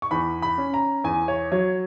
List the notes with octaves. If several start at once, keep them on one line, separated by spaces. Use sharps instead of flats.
C#6
E2 B5
B5
C#4
A#5
E2 G#5
C#5
F#3 C#5